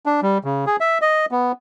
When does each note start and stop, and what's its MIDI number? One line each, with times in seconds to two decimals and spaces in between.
0.06 0.20 62
0.22 0.38 55
0.44 0.65 49
0.67 0.76 68
0.80 0.98 76
1.02 1.26 75
1.31 1.52 59